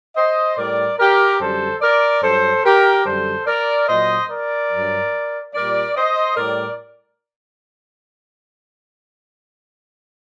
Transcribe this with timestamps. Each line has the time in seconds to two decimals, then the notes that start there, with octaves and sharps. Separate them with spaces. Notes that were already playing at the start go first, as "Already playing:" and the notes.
0.16 C5 D#5
0.57 A2 G3 A#4 D5
0.98 G4 A#4
1.40 F#2 D3 G3 A4 C5
1.81 A#4 D5
2.23 G2 F#3 A4 C5
2.64 G4 A#4
3.05 F#2 D3 G3 A4 C5
3.47 A#4 D5
3.88 A#2 F#3 C5 D#5
4.30 A#4 D5
4.71 G2 F#3
5.54 A#2 G3 A#4 D5
5.95 C5 D#5
6.36 A2 G3 A#4 D5